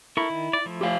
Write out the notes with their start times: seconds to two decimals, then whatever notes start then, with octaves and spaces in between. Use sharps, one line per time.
0.17 E4 A4 A#4 C#6
0.30 D#3
0.53 D5
0.66 F3 A3 E4
0.81 G4 C5 F5